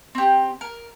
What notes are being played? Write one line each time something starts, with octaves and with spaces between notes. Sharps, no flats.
C4 G4
A#4